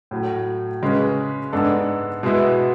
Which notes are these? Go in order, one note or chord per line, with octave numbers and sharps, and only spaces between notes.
A2 F#3 A3
C#3 G#3 C#4 G#4 B4
G#2 G#3 B3 D4 A4
B2 G#3 B3 E4